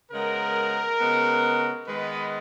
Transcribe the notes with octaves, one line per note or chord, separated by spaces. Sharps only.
C#3 G#3 B3 A#4
C#3 G#3 B3
D#3 G#3 B3 B4